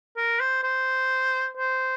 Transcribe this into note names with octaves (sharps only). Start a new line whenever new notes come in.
A#4
C5
C5
C5